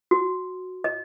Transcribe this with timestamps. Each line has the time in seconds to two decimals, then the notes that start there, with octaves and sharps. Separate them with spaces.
0.11 F#4
0.84 D#5